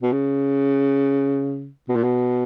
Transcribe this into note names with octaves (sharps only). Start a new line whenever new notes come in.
B2
C#3
B2
A#2
B2